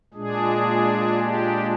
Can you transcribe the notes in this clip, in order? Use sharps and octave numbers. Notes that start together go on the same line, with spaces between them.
A#2 G#3 D4 G#4
G4